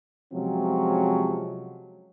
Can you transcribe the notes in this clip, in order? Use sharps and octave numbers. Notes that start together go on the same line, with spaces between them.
C3 F3 F#3 G#3 C4 C#4